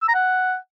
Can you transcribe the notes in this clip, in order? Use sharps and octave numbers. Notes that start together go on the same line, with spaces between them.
E6
A#5
F#5